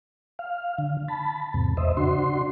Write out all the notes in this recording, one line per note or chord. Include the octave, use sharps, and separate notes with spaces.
F5
D3
A5 B5
E2 G#2 C3
E2 C5 D#5 E5
C#3 D4 F#4 C6